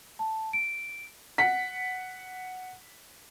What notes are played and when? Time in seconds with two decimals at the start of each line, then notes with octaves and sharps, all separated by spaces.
0.19 A5
0.53 D7
1.38 F#5 B6